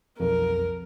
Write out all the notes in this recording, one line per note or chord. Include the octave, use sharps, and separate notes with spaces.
B1 F2 A#4